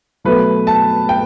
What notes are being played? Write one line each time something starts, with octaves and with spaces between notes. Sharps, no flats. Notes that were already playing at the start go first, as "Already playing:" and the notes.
B2 F#3 A3 B4
A5
G5